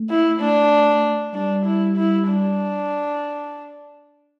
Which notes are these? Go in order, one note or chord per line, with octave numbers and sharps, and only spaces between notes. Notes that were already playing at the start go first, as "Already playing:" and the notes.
Already playing: A3
E4
A3 D4
G3 D4
E4
E4
D4